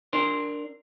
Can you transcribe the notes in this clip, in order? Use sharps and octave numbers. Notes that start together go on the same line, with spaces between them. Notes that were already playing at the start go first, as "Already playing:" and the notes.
D4 A#4 C5